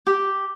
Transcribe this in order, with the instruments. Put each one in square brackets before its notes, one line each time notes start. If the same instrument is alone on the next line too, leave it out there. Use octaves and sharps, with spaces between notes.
[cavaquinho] G4